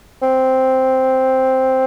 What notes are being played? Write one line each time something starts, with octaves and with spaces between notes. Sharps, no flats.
C4